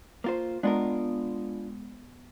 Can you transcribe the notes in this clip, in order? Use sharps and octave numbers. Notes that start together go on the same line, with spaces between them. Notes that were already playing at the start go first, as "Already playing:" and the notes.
A#3 F4 C5
G#3 B3 D4 F4 A#4